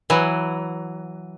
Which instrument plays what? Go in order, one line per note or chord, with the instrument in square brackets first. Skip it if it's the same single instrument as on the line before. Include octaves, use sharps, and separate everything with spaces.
[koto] E3 F#3